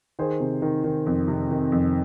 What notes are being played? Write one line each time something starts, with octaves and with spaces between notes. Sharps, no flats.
D#3 G#4 C5
C3
D#3
D#3
F2
C3
D#3
F2